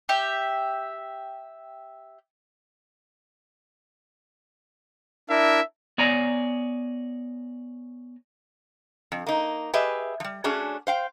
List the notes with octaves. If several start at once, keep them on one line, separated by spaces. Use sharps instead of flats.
G4 E5
D4 E4 A#4 E5
B3 C#5 D5 G#5 A#5
F2
A#3 D#4
G4 G#4 B4 D#5 E5
F3 G3
A3 C#4 D4 F#4 G#4
C5 F5 G5